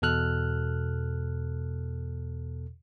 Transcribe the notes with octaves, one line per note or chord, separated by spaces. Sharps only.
E2 B2 A4 F6 F#6